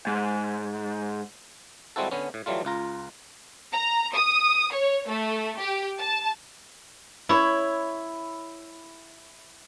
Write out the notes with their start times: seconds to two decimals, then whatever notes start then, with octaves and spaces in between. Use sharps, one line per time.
0.07 G#2
1.96 G3 G#3 C4 E4 F#4 A4
2.11 D3 B3 C#4
2.34 A2
2.46 E3 F#3 G3 A3 F4
2.65 C#2 F4 A#5
3.73 A#5
4.14 D#6
4.72 C#5
5.08 A3
5.59 G4
5.99 A5
7.29 E4 C#5